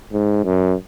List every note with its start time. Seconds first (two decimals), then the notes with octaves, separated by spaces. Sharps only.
0.12 G#2
0.44 F#2